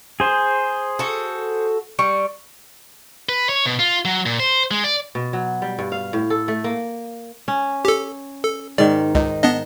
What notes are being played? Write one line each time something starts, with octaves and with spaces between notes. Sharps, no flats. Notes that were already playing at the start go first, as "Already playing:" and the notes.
G#4 C5
F#4 A4
G3 C#6
B4
C#5
B2
F4
F#3
A#2
C5
G#3
D5
B2
F#3
G3
G2
F5
A2
A4
A3
A#3
C#4
G4 A4
A4
G#2 D#3 D5
C#2 D#4
B3 D4 D#5